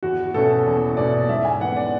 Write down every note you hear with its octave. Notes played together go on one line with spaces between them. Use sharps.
E2 F#4
B2 A3 C#4 A4
E2
B2 A3 C#4 D5
G#2 E5
G#5
E3 B3 F#5
D5